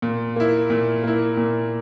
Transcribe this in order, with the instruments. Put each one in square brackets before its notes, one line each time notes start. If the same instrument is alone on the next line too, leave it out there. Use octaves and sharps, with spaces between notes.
[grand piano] A#2
A#3 E4
A#2
A#3 E4
A#2